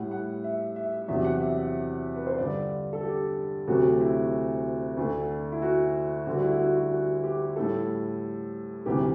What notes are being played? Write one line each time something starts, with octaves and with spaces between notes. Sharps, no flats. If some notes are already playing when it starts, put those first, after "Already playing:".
Already playing: A2 G3 F#5
F#5
E5
E5
E2 C3 F#3 E5
F#5
E5
E5
B4
C5
G2 D3 G3 D5
A4
G4
D2 C3 F#3 A3 F#4
E4
D2 D3 A3
E4
F#4
D2 D3 G3
F#4
E4
F#4
F#4
F#4
G4
A2 G3 A4
D2 C3 E3 G3 G4